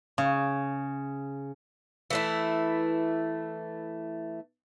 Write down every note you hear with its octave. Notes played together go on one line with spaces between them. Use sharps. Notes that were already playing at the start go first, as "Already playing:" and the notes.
C#3
E3 A3 E4